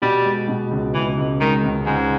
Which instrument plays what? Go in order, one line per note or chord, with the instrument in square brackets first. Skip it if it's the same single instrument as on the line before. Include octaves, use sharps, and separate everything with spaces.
[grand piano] B2 [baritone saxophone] G3
[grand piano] G#3
B2
C#2
[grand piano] C#2 [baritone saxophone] E3
[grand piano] C#2
[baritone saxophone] D#3 [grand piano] G#3
[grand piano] C#2
[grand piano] C#2 [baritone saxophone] G#2